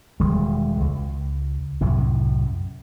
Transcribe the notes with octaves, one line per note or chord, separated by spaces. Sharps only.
E1 D#3 G3 G#3
C#2
C2 F#2 A2